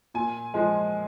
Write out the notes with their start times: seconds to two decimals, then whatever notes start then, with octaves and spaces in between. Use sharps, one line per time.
0.14 A#2 G#5
0.54 F3 G#3